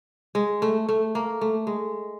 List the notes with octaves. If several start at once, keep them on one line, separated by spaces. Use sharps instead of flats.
G#3
A3
A3
A#3
A3
G#3